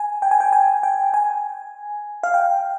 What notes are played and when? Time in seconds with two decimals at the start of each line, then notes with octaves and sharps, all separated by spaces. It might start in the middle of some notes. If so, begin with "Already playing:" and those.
Already playing: G#5
0.22 G5
0.31 G#5
0.40 G5
0.53 G#5
0.83 G5
1.14 G#5
2.23 F5
2.34 G5